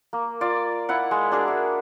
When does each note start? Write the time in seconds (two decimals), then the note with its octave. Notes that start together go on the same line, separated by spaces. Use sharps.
0.13 A#3
0.41 F4 D5
0.89 E4 F5 F#5
1.11 G#3
1.31 D4 F#4 G#4 A#4
1.48 E5